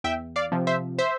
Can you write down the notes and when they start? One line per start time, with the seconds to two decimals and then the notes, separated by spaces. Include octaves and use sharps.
0.04 E2 E5 G5
0.36 D5 F5
0.52 C3 F3
0.67 C5 E5
0.98 C5 E5